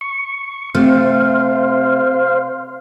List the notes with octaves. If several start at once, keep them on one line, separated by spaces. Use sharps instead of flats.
C#6
C3 A3 C5 F5